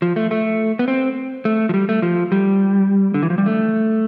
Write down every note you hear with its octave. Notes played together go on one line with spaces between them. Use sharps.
F3
A3
A3
B3
C4
A3
F3
G3
A3
F3
G3
D3
E3
F3
G3
A3